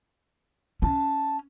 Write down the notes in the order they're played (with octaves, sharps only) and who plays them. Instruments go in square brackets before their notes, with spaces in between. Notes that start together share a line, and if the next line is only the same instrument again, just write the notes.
[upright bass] C#4 [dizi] A5